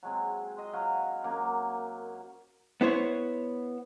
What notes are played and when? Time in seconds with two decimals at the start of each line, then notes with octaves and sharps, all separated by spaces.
0.03 F#3 G#3 C4
0.57 D#5 C6
0.73 F#3 F5
1.24 F#2 F#3 A#3 D6
2.81 B3 E4 C5 C#5